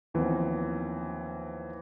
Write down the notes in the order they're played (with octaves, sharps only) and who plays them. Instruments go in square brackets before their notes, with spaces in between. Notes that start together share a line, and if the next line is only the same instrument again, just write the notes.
[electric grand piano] D#2 E3 F3 B3 C4